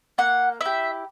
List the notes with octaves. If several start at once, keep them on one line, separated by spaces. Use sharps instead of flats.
A#3 F#5
E4 G4 E5